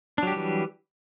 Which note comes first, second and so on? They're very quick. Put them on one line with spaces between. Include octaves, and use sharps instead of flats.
D4 F#3 G4 G3 E3